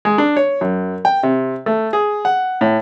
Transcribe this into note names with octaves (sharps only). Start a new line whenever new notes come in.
G#3
D4
C#5
F#2
G5
C3
A3
G#4
F#5
A2